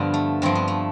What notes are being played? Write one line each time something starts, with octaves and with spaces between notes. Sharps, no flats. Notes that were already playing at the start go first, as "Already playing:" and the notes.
Already playing: G2 D3 F3 B3 F4 G4
A3
G2 F3 C4
B3
A3